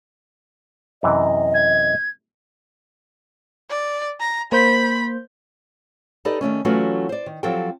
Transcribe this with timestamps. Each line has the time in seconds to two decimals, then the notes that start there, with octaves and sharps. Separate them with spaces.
1.03 F#2 C3 E3 D#5
1.54 G#6
3.70 D5
4.20 A#5
4.52 A#3 C5 B5 G6
6.25 D#4 G4 A4 B4 D5 D#5
6.41 D#3 E3 A3 C#4
6.65 E3 F#3 A3 C#4 F4 F#4
7.09 C5 D5
7.26 D#3
7.43 F3 F#3 C4 G4 A4 G5